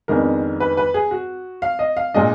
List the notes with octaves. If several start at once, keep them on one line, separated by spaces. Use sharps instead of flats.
F2 D#3 G#3 B3 D4 A#4
B4
B4
G#4
F#4
F5
D#5
F5
A#2 G#3 D4 D#5